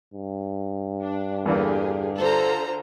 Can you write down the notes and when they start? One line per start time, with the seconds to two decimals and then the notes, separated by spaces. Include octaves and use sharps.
0.14 G2
1.03 D4
1.46 E2 D3 E3 A#3 G4 G#4
2.18 D3 F4 A4 C5 A#5